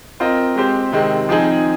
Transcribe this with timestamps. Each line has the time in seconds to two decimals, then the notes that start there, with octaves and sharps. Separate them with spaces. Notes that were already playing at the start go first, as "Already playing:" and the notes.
0.20 C4 F4 A#4 D#5
0.56 G#3 C4 G4 C5
0.92 C3 D#3 G#3 C4
1.29 F3 C4 D#4 G#4